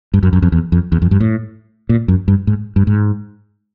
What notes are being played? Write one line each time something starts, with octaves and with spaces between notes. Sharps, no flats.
G2
F#2
F#2
F2
E2
F2
E2
F2
G2
A2
A#2
F#2
G2
G#2
G2
G#2